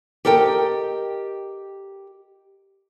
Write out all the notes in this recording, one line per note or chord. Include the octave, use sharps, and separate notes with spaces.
G4 A4 A#4 D#5 G5